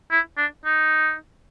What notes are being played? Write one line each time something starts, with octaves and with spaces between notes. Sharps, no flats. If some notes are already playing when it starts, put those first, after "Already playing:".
E4
D4
D#4